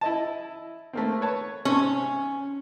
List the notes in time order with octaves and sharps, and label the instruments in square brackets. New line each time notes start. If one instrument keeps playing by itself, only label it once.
[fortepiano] E4 D#5 A5
A3 A#3 C4
B4 C#5 A5
[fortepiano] G#2 C3 [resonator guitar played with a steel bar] C#4